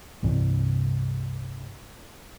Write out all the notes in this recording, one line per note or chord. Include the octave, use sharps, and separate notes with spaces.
C2 G2 C3 E3